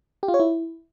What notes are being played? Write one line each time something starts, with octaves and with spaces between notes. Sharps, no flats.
G4
F4
C#5
E4